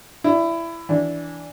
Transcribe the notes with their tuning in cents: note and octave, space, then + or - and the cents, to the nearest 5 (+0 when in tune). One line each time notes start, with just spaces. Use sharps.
E4 +20 D5 +0
E3 +0 D4 -15